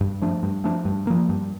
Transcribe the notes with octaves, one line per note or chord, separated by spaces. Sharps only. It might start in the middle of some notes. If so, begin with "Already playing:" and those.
G2
F3 A3 D4
G2
F3 A3 D4
G2
F3 A#3
G2